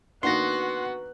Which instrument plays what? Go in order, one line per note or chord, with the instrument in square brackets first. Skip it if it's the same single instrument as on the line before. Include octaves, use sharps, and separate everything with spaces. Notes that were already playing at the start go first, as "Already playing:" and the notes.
[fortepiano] D#3 A#3 D4 [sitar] B3 [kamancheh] F#4 F#5 [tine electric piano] C6 A#6